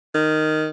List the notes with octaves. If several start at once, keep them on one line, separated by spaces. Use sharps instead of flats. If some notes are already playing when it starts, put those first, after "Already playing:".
D#3